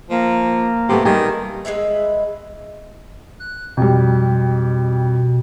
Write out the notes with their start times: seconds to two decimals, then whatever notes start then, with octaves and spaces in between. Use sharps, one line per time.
0.10 F3 A#3
0.89 C3 A3 B3 G4
1.05 D#3 G3 G4 G#4
1.65 G#3 G#4 B4 E5
3.40 F#6
3.77 F2 B2 G3